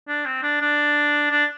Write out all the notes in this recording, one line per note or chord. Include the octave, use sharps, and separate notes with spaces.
D4
C4
D4
D4
D4